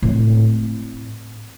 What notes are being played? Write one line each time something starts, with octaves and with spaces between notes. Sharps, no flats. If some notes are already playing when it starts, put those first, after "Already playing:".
A2 C4